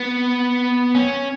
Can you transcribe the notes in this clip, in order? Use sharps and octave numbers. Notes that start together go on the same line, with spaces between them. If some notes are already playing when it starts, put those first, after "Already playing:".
Already playing: B3
C#4